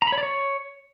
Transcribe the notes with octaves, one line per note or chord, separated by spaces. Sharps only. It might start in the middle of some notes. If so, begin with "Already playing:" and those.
A#5
B5
C#5
D5
C#5